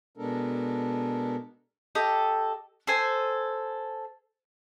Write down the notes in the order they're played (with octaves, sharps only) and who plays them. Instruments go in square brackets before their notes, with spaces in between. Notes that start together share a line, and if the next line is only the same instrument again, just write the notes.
[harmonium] B2 G#3 B3 D4 A4 A#4
[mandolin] G4 A4 D#5
A4 C5 G#5